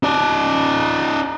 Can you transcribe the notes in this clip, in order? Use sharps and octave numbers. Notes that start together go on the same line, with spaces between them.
D#4 D5